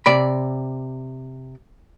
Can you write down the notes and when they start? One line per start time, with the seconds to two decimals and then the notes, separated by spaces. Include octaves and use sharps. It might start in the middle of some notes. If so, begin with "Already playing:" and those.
0.06 C3 D5 B5